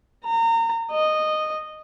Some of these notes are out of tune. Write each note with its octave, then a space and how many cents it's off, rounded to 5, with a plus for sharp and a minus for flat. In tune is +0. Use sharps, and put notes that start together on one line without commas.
A#5 -30
D#5 -10